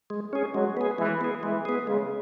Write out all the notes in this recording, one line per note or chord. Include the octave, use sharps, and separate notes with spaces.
G#3
C#4 G#4
F#3 G#3
B3 G#4
E3 G#3
B3 G#4
E3 G#3
B3 G#4
C#3 G#3